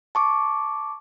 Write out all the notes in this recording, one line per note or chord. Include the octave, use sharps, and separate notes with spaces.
A5 C#6 D6